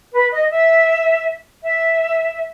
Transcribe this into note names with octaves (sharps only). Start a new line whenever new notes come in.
B4
D#5
E5
E5